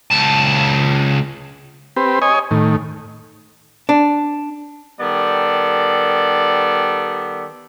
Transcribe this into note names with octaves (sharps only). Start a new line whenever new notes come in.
C#2 A5
C4 G4 B4
C#5 D#5 G#5
A2 D#3
D4
D#3 G3 B3 A4 D5